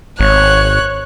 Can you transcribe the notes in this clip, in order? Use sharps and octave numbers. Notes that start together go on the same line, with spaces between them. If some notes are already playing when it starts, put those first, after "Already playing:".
G#1 C#5 F#6